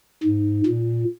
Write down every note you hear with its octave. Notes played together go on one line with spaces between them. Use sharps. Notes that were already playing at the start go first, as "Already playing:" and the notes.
G#2
A#2